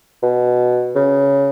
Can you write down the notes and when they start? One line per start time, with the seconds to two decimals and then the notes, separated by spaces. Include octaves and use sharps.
0.23 B2
0.96 C#3